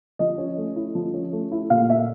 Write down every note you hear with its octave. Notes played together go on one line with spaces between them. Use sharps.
F3 D#5
C#4
A3
E4
F3
C#4
A3
E4
A#2 F5
A#3 E5